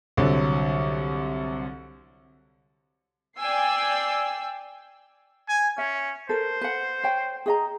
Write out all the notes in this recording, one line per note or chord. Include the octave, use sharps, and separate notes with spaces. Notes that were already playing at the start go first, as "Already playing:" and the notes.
C2 D3 F#3
D5 G5 G#5 E6 C7
G#5
C#4 E5
A4 A#4 C5
B4 F#5
C#5 G5
G#4 D#5 A#5